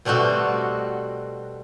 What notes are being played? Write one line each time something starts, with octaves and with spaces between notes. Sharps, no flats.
B2 G3 A3 C4 F#4